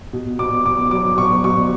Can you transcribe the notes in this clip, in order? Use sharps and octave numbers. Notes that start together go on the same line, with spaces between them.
B2
B2 D6
B2 D6
F#3 D6
B2 C#6
B2 C#6